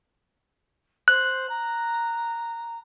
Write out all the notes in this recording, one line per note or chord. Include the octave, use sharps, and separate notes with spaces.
C5 F#6
A#5